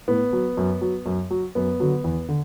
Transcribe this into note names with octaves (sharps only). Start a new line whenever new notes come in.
A2 B3
F#3
F#2
F#3
F#2
F#3
F#2 B3
D3 F#3
E2
D3